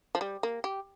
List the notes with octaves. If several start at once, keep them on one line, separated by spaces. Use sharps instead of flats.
F3
G3
A#3
G4